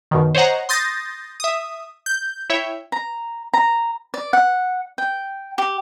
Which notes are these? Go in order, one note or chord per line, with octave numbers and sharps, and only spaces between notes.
F#2 B2 D#3
C5 C#5 D#5 F#5 A#5
C6 D#6 G6 A6 A#6
E5 D#6
G6
E4 C#5 E5 G5
A#5
A#5
D5
F#5
G5
G4